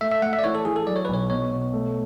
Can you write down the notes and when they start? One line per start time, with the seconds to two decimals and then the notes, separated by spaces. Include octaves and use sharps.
0.01 A3 E5
0.11 E5
0.22 A3 F#5
0.33 E5
0.39 D5
0.44 E3 C#5
0.55 A4
0.65 E3 G#4
0.76 A4
0.87 F#3 D5
0.96 C#5
1.05 B1 B4
1.14 C#5
1.30 B2 C#5
1.51 B2
1.73 A3